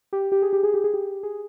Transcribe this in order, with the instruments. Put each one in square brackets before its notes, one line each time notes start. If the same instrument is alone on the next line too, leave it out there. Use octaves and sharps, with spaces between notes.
[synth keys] G4
G4
G#4
G4
G#4
G4
G#4
G4
G#4